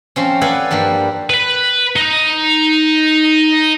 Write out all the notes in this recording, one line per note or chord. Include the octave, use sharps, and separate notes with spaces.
F3 C4 C#4
A4 B4 D5 F5 F#5 G#5
G2 F3 G3 A#3
B4 B5
D#4